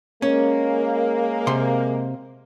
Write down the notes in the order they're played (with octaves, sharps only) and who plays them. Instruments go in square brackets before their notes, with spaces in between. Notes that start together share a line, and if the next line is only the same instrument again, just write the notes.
[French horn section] G#3 A#3 [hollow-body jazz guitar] C#4
[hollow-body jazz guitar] C3 C6